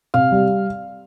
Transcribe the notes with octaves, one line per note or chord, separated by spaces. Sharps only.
C3 F5
G3